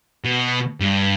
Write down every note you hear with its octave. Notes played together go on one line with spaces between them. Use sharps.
B2
G2